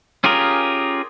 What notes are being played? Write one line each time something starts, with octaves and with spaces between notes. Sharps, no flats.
C#4 F4 G4 G#4 A#4